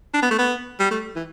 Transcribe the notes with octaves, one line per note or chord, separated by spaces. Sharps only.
D4
B3
A3
B3
G3
A3
E3